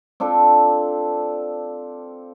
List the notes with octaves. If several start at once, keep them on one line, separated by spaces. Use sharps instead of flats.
C4 D4 F4 A4